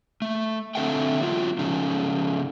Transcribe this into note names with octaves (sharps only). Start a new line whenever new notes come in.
A3
D3 C4 A4 E5 F#5 G5
F#3 B3 F4
C#3 F3 A3 C#4 D#4